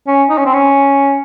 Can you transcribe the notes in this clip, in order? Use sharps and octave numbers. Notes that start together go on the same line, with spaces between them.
C#4
D#4
C#4
C4
C#4